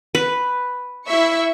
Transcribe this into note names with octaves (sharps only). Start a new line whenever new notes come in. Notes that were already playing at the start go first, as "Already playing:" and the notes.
B4
E4 E5 C#6